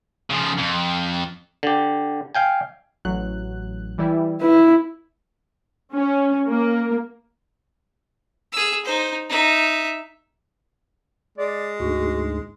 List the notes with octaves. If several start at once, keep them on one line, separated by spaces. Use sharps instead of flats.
C#3 F3
F2
D3 G4
F5 G5 G#5
A1 F#3 F#6
E3 G3 E4
E4 B4
C#4
A#3
G#4 E6
D#4 C5
D#4 E5
G#3 D5
D2 G#2 F#4